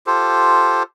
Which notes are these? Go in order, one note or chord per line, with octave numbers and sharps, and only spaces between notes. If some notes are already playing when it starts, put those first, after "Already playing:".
F4 G4 A4 C5